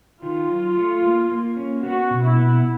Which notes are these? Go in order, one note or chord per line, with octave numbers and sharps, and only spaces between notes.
D#3 F4
F#3
A3
A#3
A#3
C#4
B3 F#4
B2
E4
B3